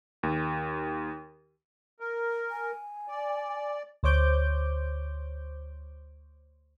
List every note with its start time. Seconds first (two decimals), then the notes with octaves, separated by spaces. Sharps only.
0.23 D#2
2.00 A#4
2.51 G#5
3.08 D5
4.03 D2 C5 C#5 D6 G6